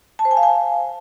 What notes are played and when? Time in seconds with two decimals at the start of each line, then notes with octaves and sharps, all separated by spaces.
0.19 A5
0.25 C5
0.31 G#5
0.37 F5
0.43 G#5